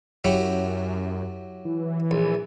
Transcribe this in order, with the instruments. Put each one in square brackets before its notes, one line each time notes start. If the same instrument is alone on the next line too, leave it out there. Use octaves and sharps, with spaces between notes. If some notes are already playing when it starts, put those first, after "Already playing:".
[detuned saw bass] F#2 [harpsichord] F#3 E4 G4
[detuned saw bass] E3
[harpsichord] A#1